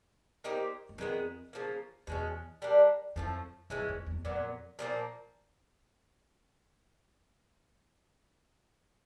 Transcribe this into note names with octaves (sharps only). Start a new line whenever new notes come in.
A#3 D#4 G4 C5
F#2
F2 D#3 G#3 B3
C#3 F3 A#3
E2 B2 G#3 C#4
G3 A#3 D4
F2 A2 F3 A3
F#2 E3 G#3 C#4
F2
E2
F2 A#2 F#3 B3
A#2 F3 A#3